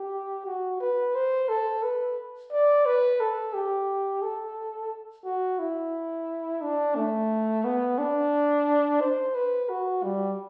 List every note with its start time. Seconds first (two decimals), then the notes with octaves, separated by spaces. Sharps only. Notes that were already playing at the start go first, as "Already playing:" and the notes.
Already playing: G4
0.46 F#4
0.80 B4
1.15 C5
1.49 A4
1.83 B4
2.52 D5
2.86 B4
3.20 A4
3.54 G4
4.22 A4
5.25 F#4
5.59 E4
6.62 D4
6.96 A3
7.65 B3
7.99 D4
9.01 C5
9.35 B4
9.70 F#4
10.03 G3